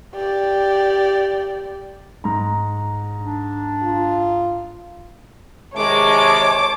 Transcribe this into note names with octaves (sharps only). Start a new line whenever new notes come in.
G4 D5
G#2 A#5
D4
F4
C3 D#3 G#3 C#5 A5 D6